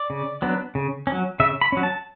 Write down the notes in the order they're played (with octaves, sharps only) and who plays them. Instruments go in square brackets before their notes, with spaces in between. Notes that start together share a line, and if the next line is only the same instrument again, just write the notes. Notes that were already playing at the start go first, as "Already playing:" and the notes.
Already playing: [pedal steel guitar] D5
C#3
F#3 B3 D4
C#3
C#4
F#3
C#3 E5
B5
F#3 C#4
A5